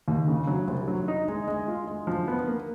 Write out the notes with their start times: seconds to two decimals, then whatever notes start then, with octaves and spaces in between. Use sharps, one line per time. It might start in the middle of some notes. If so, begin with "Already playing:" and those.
0.08 D#2
0.28 C#3
0.47 F#3
0.68 C2
0.88 F#3
1.08 D#4
1.28 G#3
1.48 G#3
1.68 F4
1.87 G#3
2.07 F3
2.28 B3
2.48 A#3